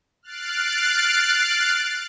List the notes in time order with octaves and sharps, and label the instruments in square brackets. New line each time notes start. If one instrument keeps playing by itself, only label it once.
[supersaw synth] F6 F#6 A6 C7 D7